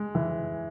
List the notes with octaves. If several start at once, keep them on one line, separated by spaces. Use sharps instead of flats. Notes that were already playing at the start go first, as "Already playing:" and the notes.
Already playing: G#3
E3